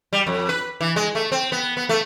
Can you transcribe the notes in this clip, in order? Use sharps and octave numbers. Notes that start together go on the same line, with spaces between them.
G3
F2
B4
E3
G#3
A3
C4
B3
B3
A3